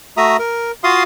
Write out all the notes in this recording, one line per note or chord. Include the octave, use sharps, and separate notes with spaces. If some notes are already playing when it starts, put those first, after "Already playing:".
A3 F#4 E5 A#5 D#6
A#4
F4 F#4 F5 C6 D#6